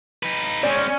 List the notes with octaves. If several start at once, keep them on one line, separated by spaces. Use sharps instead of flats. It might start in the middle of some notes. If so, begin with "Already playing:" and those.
D#4 B4
G#3 C4 C#4 D5